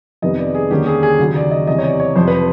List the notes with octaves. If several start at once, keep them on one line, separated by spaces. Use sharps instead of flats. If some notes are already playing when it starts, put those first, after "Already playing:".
F2 C3 D#3 G3 B3 D#5
D5
G#4
D#2 D3 G3 A#3 C#4 G4
G#4
G#4
D#2 C#3 F#3
D5
D#5
E2 C3 E3 G3 D#5
C#5
D5
C#5
F2 C3 F3 C5
B4